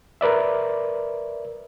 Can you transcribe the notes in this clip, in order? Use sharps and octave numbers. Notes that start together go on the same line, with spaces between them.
A#4 B4 D5 E5